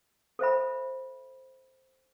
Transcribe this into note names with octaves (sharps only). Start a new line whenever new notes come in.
A4 C5 E5 B5